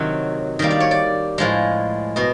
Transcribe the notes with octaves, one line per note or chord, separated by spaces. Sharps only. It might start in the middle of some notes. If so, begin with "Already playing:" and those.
Already playing: C3 D#3 F#3 C#5
D#3 G3 A#3 D#5
D5
C#5
D5
A2 F3 G#3
B2 D#5